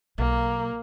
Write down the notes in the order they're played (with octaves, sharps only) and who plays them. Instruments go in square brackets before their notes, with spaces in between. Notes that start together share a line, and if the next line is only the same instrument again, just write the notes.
[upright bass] B1 [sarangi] A#3